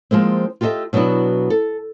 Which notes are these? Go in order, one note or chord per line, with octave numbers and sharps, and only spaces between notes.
F3 G#3 A#3 C4
F4 G4 A4 C5 D#5 E5
B2 F#3 B3 D4 E4
A4